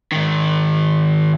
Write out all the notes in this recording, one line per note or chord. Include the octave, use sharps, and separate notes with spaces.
G#2 D#3